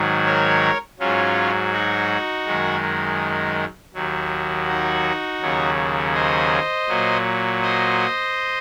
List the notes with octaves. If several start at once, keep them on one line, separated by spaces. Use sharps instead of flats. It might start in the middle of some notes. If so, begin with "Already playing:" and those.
Already playing: G#2 D#3 F#3
A#4 C#5
G#2 F#3 C#4 F4
D#4 F#4
F#2 D#3 G#3
D#2 D#3 F#3
D#4 F#4
D#2 C#3 F#3
C5 D#5
A#2 F#3
C5 D#5